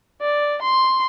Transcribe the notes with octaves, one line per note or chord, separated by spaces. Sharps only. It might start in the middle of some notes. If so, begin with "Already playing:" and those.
D5
C6